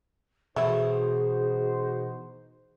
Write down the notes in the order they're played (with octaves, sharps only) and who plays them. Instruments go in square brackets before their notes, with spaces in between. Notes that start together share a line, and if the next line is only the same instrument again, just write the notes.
[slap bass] B2 E3 [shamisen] A3 E4 [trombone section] D#4 F#4 C5 [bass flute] G#4